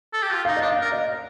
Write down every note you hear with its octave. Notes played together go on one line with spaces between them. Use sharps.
A4
G4
F4
D#4 F5
D4 D#5
F5
A#4
D#5